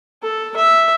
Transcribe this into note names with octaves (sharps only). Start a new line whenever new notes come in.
A4
E5